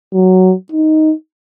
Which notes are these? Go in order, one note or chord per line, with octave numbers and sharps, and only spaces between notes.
F#3
D#4